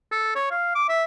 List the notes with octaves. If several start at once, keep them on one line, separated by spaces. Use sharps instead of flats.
A4
C#5
F5
D6
E5